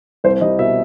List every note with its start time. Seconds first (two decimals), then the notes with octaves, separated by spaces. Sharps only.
0.24 C2 C5
0.41 G3 D#5
0.59 B2 E5